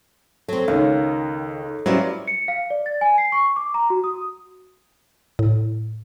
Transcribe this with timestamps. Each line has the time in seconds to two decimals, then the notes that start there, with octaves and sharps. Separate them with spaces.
0.48 F#3 C4 A4
0.68 C#2 D#3 D#4 C#5 F5
1.86 F#3 G3 C#4 E4 F4 B4 C5 D5
2.27 C#7
2.48 F5
2.70 D5
2.86 A6
3.01 G#5
3.18 C7
3.32 C#6
3.56 D6
3.74 A#5
3.90 F#4
4.04 D#6
5.39 A2